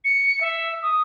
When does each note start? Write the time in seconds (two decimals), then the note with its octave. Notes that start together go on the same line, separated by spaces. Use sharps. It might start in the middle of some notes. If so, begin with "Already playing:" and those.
0.04 C#7
0.40 E5
0.82 D#6